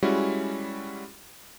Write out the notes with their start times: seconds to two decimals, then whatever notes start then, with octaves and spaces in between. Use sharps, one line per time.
0.03 G3 G#3 C#4 E4 F#4